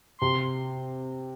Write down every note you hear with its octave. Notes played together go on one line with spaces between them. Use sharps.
C3 C6